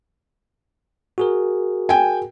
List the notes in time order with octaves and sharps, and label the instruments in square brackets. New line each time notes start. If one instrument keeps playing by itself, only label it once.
[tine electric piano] F#4 G#4 A#4
[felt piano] G5 G#5